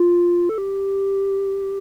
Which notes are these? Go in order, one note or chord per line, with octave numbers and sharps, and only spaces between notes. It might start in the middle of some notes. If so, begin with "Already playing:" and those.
Already playing: F4
A4
G4